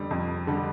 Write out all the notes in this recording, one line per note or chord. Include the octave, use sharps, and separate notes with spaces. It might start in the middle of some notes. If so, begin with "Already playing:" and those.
Already playing: F2 D3 G3
F2
D3 G3